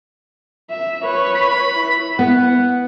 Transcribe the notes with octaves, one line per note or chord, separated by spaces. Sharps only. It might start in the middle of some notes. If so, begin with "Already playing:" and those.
E5
B4 C#5
B5
E4
B3 F#5